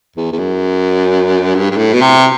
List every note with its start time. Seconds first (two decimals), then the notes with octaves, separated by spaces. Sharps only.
0.16 E2
0.32 E2
0.38 F#2
1.55 G2
1.71 G2
1.77 A2
1.93 B2
2.01 C3